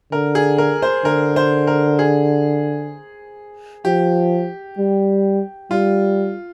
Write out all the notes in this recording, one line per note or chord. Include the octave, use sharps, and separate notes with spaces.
D3 A#4
G#4
A#4
C5
D3 A#4
C5
A#4
G#4
F3 G4
G3
G3 F4